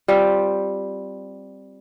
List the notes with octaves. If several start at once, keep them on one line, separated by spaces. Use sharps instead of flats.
G3 C4 F4